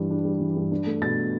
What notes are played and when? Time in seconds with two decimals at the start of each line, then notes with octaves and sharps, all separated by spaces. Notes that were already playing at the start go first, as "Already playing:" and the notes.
Already playing: G2 E3 G3 D4
0.10 D4
0.25 G3
0.40 E3
0.56 G2
0.71 D4
0.86 A3
1.02 B2 A6